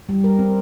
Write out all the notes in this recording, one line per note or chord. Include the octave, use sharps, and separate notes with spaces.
G3
A#4
C4